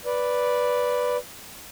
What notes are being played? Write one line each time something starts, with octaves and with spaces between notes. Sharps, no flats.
B4 D5